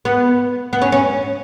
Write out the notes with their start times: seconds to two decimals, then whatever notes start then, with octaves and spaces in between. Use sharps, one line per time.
0.05 B3
0.73 B3
0.82 C#4
0.92 C#4